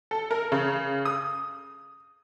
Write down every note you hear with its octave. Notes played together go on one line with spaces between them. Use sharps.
A4
A#4
C#3
D#6